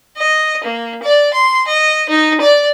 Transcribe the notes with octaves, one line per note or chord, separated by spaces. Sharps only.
D#5
A#3
D5
C6
D#5
D#4
D5